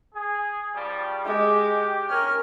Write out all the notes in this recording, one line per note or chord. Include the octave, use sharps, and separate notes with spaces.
G#4
C#3 F3 G3
G#3 G4
C#4 A#4 F6